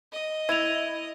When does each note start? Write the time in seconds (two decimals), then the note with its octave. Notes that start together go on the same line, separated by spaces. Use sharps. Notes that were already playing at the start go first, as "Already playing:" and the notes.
0.12 D#5
0.49 E4 G#6 F7